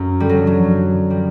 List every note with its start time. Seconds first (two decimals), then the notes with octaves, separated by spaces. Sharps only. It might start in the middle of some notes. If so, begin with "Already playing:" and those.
Already playing: F#2
0.20 D3 G3
0.29 F#3
0.47 F#3
0.65 F#2
1.10 F3 G3